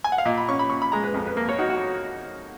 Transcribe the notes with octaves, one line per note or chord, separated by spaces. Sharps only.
G#5
F#5
F5
A#2 D#5
B5
C#4 C#6
B5
A#2 C#6
B5
G#3 A#5
B4
F2
B4
A#3
C#5
D#4 F#4
F#4